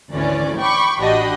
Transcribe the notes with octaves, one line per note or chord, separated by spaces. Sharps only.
G#1 D2 E3 C#4 D5
G5 B5 C#6 D6
A1 D4 F#4 G4 D#5 B5